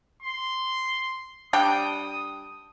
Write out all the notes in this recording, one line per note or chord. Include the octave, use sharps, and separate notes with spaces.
C6
G3 D4 G5 D#6